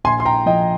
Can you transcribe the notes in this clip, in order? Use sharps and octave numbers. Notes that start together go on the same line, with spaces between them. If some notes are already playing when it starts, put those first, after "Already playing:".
A#1 G#5 C6
C6
G5 A#5
F3 D#5 G5